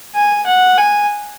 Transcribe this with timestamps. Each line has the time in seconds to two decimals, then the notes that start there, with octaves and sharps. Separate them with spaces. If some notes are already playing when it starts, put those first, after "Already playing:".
0.15 G#5
0.46 F#5
0.77 G#5